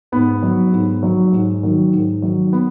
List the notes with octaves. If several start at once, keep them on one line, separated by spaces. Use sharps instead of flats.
G#2 B3
F#3
G#2
F#3
G#2
D#3 F#3
G#2
D#3 F#3
B3